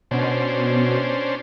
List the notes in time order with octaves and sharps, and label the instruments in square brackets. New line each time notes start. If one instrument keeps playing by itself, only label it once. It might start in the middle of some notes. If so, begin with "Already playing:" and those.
[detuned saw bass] B2 [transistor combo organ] C#4 D4 C5